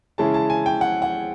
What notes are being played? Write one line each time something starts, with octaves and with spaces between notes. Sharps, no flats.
C#3 E3 G#3 C#4 E4 A5
A5
G#5
G5
F#5
F#5